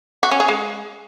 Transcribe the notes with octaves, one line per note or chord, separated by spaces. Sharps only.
F#4
C#4
G#4
G#3